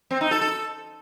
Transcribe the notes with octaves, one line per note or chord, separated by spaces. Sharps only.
C4
D#4
A4
A4